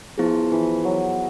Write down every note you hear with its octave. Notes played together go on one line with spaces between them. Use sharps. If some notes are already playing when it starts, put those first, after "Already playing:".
F3 B3 E4 G#4
E3
F#3